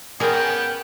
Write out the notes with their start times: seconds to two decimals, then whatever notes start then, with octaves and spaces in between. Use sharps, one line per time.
0.20 B3 C#4 G#4 A#4 G5